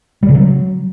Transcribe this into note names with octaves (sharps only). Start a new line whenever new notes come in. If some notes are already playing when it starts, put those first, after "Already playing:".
G3
C#3
F#3